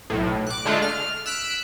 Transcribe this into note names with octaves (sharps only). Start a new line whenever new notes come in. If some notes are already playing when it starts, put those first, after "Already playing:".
B1 A2
D6 F#6
D3 G#3 A3 D4 F4
F6
E6 F#6 B6 D7